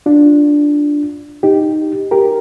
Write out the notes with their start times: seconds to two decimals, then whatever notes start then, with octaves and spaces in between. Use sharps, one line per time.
0.06 D4 F4
1.43 D#4 G4
2.11 G4 A#4